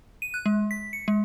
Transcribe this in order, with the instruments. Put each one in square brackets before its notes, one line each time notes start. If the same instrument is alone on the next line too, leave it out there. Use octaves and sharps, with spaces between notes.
[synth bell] D#7
F#6
G#3
B6
C#7
G#3